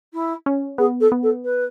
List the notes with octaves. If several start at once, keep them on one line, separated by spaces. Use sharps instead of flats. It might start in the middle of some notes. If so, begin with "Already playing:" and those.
E4
C#4
B3 G#4
A4
B3
A4
B4